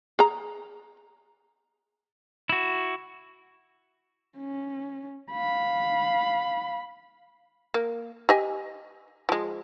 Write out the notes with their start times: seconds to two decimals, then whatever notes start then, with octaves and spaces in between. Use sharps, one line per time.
0.19 G#4 A#5
2.49 E4 F#4
4.37 C#4
5.31 F5 B5
7.74 A#3
8.29 G4 D#5 G#5
9.29 F3 G#3